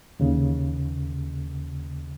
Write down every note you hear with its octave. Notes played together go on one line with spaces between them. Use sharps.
D#2 C#3